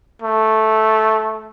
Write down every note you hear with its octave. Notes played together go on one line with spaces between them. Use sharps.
A3